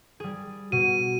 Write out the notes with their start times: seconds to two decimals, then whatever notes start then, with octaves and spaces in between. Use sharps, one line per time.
0.20 G3 G#4
0.72 B2 F#4 D#7